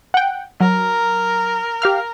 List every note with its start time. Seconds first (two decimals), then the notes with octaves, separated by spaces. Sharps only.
0.14 F#5 G5
0.60 F#3 A#4
1.82 G4 F5 F6